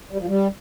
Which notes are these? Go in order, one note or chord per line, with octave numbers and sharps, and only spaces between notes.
G3
F3
G3